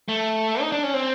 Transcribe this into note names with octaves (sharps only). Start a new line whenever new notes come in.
A3
D#4
D4
C#4
C4